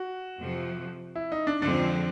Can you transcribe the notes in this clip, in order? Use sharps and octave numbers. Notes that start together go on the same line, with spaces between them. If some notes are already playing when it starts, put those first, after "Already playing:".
Already playing: F#4
F2 C3 F3
E4
D#4
D4
F2 D3 F3 G#3 C4 D4